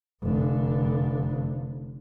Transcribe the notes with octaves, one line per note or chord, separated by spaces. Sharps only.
F1 D3